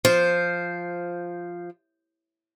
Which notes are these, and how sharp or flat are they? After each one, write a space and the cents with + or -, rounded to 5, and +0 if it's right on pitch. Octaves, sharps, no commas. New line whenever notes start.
F3 +0 C5 +0